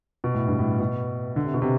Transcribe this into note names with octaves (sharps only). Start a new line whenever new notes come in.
B2
A2
G2
A2
B2
D3
C3
B2
C3